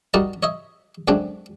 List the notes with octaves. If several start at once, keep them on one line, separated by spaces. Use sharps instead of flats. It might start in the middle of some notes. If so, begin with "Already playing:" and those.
G3 D#4 F#4 A#4 D5 A5
C#5 D#5 E5
F#2 D3 G#3 A3 C4 D4